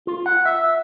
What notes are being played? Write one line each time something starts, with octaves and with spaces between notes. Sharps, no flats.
F4
F#5
E5